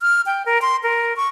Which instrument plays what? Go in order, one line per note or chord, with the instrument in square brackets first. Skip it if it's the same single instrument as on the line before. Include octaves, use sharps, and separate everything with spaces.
[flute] F6
G5
A#4
C6
A#4
C#6